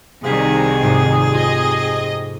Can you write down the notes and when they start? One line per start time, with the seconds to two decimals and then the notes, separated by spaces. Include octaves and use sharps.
0.24 C2 C3 D#3 G#4 F5 B6 C7
0.81 F1 G#2 C7
1.34 F4 D#5